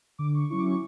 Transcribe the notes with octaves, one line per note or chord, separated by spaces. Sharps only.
D3 D6
C#6
F#3 C#4 E4 C#6
D6
C#6